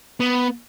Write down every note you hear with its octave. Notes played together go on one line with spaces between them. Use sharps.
B3